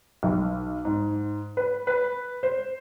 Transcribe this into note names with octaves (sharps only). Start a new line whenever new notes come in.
B1
G#2
B4
B4
C5